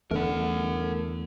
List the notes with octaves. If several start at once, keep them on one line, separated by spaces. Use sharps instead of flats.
E2 D3 A3 A#4 F#5